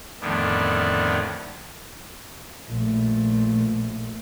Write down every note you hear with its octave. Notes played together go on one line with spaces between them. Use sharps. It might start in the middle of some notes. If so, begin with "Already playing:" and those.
F2 A2 D3 D#3 B3 D4
A#1 A3